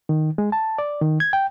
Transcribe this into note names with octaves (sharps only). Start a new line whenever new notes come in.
D#3
G#3
A5
D5
D#3
G#6
G5